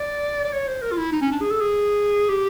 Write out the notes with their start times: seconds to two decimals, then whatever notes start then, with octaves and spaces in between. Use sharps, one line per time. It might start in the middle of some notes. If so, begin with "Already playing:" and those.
Already playing: D5
0.45 D5
0.53 C#5
0.68 C5
0.82 A#4
0.92 F4
0.97 E4
1.12 D#4
1.21 C#4
1.32 D4
1.41 G#4
1.51 A4
1.61 G#4
2.30 G4